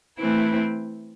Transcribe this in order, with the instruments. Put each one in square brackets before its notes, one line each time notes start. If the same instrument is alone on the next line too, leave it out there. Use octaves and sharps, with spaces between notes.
[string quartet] E3 A3 C4 E4